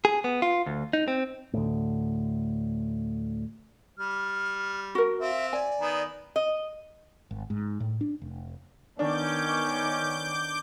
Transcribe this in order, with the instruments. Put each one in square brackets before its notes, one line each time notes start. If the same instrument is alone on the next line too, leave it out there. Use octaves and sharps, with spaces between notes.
[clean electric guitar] G#4
B3
F4
D2
D#4
C4
[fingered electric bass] D2 A2
[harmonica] G3 [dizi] F6
[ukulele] F#4 A#4
[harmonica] C4 F5 [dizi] E5
[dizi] D5 [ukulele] G#5
[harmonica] D#3 B3 A#5
[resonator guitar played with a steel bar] D#5
[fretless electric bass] G#1
G#2
A2
D4
F1
[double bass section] D#3 B3 [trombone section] C#4 [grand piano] D4 [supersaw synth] D6 G6